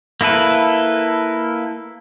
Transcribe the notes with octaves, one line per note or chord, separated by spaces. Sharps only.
A#3 E4 A4 B4